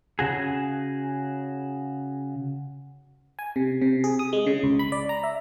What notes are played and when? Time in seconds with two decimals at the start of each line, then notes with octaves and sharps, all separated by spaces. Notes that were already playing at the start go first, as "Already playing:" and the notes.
0.19 C#3 F#4 G#4
3.39 G#5
3.56 C3
3.82 C3
4.04 G#4
4.19 D#6
4.33 G#3
4.47 C#3
4.63 C#2
4.79 B5
4.92 D5
5.09 A#5
5.23 E5